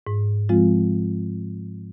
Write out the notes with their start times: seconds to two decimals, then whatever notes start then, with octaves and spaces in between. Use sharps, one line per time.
0.07 G#2
0.49 F3 G#3 C4 F4